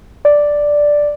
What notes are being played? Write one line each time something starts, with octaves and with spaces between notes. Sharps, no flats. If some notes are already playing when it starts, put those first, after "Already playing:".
D5